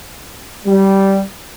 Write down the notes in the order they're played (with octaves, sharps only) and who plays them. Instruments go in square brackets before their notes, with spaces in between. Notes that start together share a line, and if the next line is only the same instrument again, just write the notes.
[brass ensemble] G3